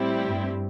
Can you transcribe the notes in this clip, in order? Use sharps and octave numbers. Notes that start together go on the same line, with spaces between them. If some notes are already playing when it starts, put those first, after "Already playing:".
Already playing: A2 G3 C4 E4 G4
G2